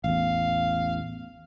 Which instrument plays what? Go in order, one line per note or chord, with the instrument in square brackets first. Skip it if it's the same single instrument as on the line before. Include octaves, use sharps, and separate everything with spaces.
[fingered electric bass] A1 E2 [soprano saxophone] F5